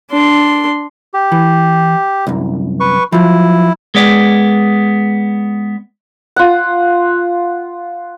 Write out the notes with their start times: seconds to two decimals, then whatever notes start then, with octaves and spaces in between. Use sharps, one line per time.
0.11 D4 C6
1.14 G4
1.32 E3
2.27 C2 F#2
2.80 B4 C#6
3.12 F3 F#3 E4
3.95 G#3 B3 D5
6.36 F4 F#5